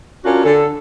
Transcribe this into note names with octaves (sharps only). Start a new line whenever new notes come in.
C#4 D4 F4 F#4 A#4
D3 A4